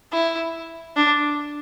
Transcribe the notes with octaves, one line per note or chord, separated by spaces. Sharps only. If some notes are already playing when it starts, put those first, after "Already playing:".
E4
D4